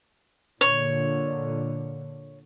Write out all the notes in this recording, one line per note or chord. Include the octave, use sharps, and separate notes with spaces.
A#2 D3 C#5